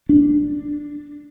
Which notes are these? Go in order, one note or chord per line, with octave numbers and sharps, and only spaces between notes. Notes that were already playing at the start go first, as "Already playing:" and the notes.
D4